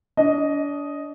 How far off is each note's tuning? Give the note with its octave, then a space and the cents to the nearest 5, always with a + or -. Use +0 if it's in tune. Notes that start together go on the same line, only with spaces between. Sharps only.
D4 -35 D#5 +0